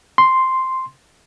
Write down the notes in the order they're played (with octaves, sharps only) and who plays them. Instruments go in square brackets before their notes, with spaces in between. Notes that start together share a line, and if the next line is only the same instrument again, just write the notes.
[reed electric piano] C6